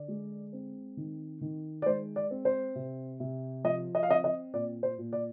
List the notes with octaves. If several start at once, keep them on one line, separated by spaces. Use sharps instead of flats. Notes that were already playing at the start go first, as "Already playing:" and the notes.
Already playing: D3 D5
G#3
C4
D#3
D#3
D5
G#3 C5
D5
C4
C5
C3
C3
F3 D#5
D#5
F5
C4 D#5
D#5
A#2 D5
C5
A#2
D5